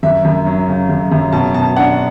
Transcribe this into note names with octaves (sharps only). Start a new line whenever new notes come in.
F#2 E5
F#2
F#3
C#3
F#2
F#2
B2 A5
B2 A5
D4 F#5